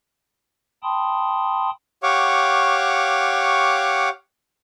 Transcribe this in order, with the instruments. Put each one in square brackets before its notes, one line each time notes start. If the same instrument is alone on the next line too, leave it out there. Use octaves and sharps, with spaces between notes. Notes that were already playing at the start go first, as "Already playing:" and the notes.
[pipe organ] G5 A5 B5 C6 D#6
[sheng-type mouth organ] G4 C#5 F5 F#5 C#6 D6